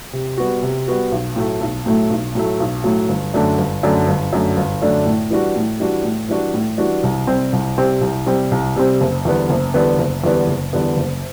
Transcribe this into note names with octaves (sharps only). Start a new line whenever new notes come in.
C3
G3 B3 F#4
C3
G3 B3 F#4
B1
A2 F#3 A3
B1
A2 F#3 A3
B1
A2 F#3 A3
B1
A2 F#3 A3
G1
F#2 D3 A3 D4
G1
F#2 D3 A3 D4
G1
F#2 D3 A3 D4
G1
F#2 D3 A3 D4
A2
E3 G3 D4 F#4
A2
E3 G3 D4 F#4
A2
E3 G3 D4 F#4
A2
E3 G3 D4 F#4
C2
C3 G3 C4
C2
C3 G3 C4
C2
C3 G3 C4
C2
C3 G3 C4
F#1
E2 D3 G3 B3
F#1
E2 D3 G3 B3
F#1
E2 D3 G3 B3
F#1
E2 D3 G3 B3
F#1